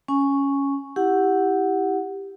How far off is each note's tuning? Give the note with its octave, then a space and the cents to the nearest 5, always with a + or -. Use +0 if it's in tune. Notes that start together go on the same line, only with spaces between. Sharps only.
C#4 +0 G#5 +0 C#6 +0
E4 +0 G4 +0 F#5 +0